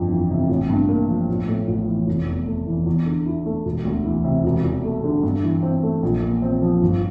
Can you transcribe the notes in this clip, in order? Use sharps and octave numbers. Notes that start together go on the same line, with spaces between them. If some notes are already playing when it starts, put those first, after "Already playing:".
Already playing: G1 F2 D3
E3
C3
A1
G2
A#3
F3
A1
A2
A1
E3
F1
E2
A3
E3
E2
D3
E4
A3
E1
D2
E3
C3
E1
E2
A3
D3
G2
E3
C4
A3
A#1
A#2
C4
F3
G1